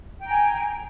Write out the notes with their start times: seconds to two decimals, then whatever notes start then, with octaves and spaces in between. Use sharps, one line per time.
0.19 G5
0.24 A#5
0.29 G#5